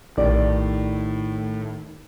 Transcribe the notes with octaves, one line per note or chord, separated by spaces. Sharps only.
A#1 A2 D#3 G4 D5